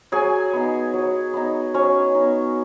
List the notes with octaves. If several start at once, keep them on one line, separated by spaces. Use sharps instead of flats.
F#3 G#4 G#5
B3 D#4
F#3
B3 D#4
F#3 C#4 C#5
B3 D#4